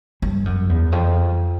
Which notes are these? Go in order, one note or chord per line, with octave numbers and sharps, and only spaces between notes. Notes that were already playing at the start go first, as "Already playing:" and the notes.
G2
F#2
E2
F2